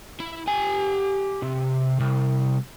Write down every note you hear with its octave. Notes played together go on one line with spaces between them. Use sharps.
E4
G4 G#5
C3
C2